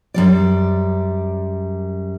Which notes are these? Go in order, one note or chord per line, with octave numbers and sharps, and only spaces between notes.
F#2 G3 D5